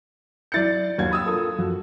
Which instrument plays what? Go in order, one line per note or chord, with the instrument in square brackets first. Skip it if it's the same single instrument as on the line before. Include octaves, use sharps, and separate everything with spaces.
[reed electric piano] F#3 E4 G6 [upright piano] D5 A6 C#7
[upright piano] D#2 G#6 [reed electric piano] F#3 D4
[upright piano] B5 D#6 E6
[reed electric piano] F4 A4 A#4
[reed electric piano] F#2 F3 [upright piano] F#4